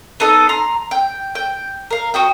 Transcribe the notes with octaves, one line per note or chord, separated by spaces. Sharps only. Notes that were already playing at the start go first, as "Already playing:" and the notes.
B3 D#4 A4 D#5
A#5 C6
G5
G5
A#4 F5
F#4 D#5 G5